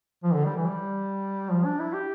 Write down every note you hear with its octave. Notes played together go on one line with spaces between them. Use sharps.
F3
D3
G3
E3
G3
F3
D4
E4
G4